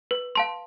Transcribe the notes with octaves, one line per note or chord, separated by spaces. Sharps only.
B4
F5 A5 C6